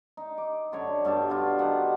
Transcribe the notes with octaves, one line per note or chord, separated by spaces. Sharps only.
D#4
D6
F#2 D3 C#5
G2 B2 D4 A5
B3 D4 F4 F#4
B2 D#3 G4 F#5